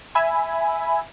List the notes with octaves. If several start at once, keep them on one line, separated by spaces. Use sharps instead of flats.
E5 G#5 B5